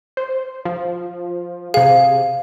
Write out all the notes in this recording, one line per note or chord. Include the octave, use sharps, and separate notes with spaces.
C5
F3
C3 G#4 F5